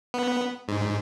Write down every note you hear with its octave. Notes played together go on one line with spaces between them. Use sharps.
B3
G#2